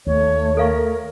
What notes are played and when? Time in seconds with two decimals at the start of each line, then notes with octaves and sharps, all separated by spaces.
0.07 D#2 A3 C#5
0.57 A4 A#4 F5 C#6